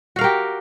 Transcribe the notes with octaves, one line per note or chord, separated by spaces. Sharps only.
F#4 G4 A#4 F5